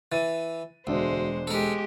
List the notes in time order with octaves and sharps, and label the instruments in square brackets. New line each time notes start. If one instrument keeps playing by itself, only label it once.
[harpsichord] E3 [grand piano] A6 D#7
[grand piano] E1 D4 [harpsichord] D2 [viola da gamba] G#3 C5
[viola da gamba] G#3 G4 [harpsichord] A4 A#4